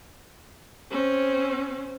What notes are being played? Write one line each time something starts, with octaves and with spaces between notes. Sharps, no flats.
C4 C#4